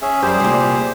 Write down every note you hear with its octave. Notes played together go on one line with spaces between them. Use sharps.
C#4 G#4 E5
F#2 G3 G4 G#4 C5
C2 A#2